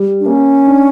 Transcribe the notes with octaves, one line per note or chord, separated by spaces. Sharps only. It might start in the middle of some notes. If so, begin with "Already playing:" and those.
Already playing: G3
D4
A#3 C#4
D4